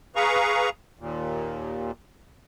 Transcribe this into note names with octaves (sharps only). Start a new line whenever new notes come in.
G#4 B4 F5 A#5 C#6
D#2 A#2